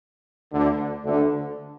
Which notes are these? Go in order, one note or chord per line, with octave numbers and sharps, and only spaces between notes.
D2 D3
D2 D3